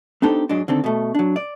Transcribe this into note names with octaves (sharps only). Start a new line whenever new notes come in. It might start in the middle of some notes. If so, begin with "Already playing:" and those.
B3 D4 D#4 G4 A4 C5
G#2 F#3 G#3 D4
D3 D#3 C4 A4
B2 A3
F#3 D4
D5